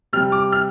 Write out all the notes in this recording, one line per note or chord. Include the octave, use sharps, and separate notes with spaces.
C3 G3 F6
D6
F6